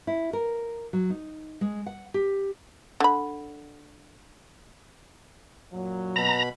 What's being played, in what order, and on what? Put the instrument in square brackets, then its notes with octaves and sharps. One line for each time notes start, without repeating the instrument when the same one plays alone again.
[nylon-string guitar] E4
A#4
F#3
D#4
G#3
F#5
G4
[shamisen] D3 B5
[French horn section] F#2 A#2 F#3
[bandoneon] B2 B5 [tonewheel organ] A#5